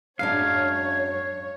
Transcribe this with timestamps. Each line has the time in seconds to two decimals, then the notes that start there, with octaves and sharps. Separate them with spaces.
0.19 F#2 G#3 D4 C#5 F5 G#6